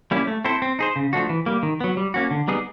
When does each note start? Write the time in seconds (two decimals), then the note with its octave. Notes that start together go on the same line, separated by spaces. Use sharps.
0.11 G3 A#3 C#4 E4
0.27 A3
0.45 C4 E4 A4 C5
0.62 C4
0.79 D#4 G#4 C5
0.96 C#3
1.13 F3 A3 D4 F#4
1.29 E3
1.46 G3 A#3
1.63 D#3
1.80 F#3 B3
1.97 G3
2.14 A#3 C#4 F#4
2.31 D3
2.48 G3 B3 D#4 G#4